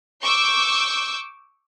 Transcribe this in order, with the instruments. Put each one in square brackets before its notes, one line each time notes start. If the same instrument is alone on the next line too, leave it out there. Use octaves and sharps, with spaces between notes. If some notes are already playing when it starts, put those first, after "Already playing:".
[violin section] C#6 D6 E6 G6